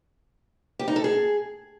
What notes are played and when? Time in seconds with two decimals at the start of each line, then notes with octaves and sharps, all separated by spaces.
0.79 G4
0.88 D#4
0.96 A4
1.04 G#4